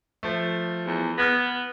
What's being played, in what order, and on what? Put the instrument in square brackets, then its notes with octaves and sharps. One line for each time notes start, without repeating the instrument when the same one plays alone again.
[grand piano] F3 A3
[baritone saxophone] E2
[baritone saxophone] B3 [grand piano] F6 G#6 A#6